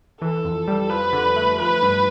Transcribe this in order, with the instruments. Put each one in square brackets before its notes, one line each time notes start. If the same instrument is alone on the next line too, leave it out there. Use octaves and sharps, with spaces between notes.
[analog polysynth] E3 [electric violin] A4
[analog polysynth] F2
G3
[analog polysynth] F3 [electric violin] B4
[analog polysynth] D3
A3
[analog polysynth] F3 [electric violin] B4
[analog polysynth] G2